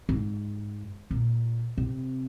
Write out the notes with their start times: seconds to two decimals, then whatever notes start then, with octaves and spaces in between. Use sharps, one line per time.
0.09 G#2
1.11 A#2
1.78 C3